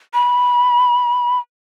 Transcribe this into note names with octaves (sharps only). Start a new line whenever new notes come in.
B5